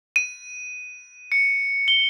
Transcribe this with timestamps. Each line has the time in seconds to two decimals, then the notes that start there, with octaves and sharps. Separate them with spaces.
0.16 D#7
1.32 C#7
1.88 G7